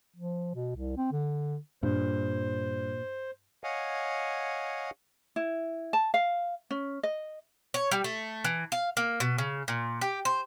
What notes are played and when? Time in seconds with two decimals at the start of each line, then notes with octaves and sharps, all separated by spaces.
0.16 F3
0.55 B2
0.75 C2
0.97 C4
1.12 D3
1.83 G2 A#2 C5
3.64 C#5 D#5 F5 F#5 G#5
5.36 E4
5.93 A5
6.14 F5
6.71 C#4
7.03 D#5
7.74 C#5
7.91 G3
8.04 A3
8.44 E3
8.72 F5
8.97 A#3
9.20 B2
9.38 C#3
9.68 A#2
10.01 G4
10.25 C5